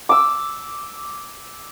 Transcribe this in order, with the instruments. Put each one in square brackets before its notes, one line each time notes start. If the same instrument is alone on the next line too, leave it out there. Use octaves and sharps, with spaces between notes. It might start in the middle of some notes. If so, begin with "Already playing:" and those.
[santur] D6 E6